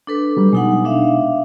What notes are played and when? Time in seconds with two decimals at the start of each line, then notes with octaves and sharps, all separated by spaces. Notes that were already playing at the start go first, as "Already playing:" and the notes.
0.07 D4 A4 B4
0.37 F#3 G3
0.53 B2 G#3 D#4 F#5
0.85 D4 E5 F5